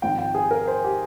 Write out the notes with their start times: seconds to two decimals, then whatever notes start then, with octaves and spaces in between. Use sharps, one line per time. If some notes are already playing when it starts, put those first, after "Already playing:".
0.02 G#1 G#2 F3 G5
0.18 G5
0.35 G#4
0.51 A#4
0.68 C5
0.84 G4